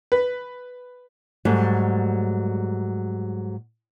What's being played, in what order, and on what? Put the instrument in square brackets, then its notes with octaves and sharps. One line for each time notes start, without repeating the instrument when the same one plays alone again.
[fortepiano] B4
[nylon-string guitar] G#2 F#3 G3 A3